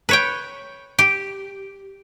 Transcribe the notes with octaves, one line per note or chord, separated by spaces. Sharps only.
B4 C#5 G5
G4